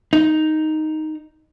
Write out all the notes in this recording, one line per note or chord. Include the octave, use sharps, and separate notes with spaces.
D#4